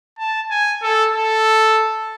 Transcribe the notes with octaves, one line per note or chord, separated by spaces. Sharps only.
A5
G#5
A4
A4